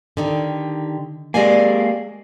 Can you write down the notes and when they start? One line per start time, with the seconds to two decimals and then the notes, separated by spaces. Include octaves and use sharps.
0.17 D3 D#3 G4
1.34 G#3 A#3 G4 D5 G#5